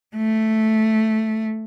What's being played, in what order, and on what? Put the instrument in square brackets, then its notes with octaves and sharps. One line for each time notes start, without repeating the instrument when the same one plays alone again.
[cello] A3